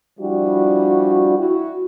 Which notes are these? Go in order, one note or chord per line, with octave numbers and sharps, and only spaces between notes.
F3 G3 D4 E4 F#4
E4 F#4